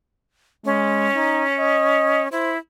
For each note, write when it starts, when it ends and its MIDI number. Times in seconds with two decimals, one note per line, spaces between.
0.65 1.09 56
0.65 2.28 61
1.16 1.43 63
1.59 2.24 75
2.32 2.58 64
2.32 2.54 72